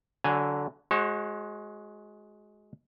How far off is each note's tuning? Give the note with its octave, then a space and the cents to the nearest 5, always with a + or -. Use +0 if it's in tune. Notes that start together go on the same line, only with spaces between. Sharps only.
D3 -10 F#3 +15 G#5 +0
G#3 +15 F#4 +0 C#5 -40